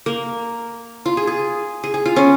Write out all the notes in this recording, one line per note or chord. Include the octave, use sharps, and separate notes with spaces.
A#3
F4
G#4
G#4
G#4
G#4
F4
C#4